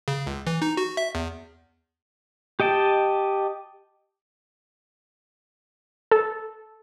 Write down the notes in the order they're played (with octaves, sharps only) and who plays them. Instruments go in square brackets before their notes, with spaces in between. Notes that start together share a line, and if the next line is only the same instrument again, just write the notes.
[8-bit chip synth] C#3
C#2
E3
D#4
F#4
E5
E2
[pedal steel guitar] G4 D#5 G5 A5
[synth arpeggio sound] A4